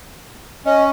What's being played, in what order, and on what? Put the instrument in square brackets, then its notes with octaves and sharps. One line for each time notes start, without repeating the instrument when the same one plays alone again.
[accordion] C#4 [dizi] D#5